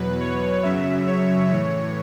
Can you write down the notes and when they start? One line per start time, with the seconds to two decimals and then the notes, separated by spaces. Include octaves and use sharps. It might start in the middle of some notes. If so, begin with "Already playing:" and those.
Already playing: E2 B2 F#3 B4
0.20 C#5
0.63 F#2 C#3 F#3 E5
1.07 C#5
1.50 A2 E3 C#5